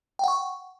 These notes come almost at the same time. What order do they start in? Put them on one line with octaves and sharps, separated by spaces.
G5 F#5 C#6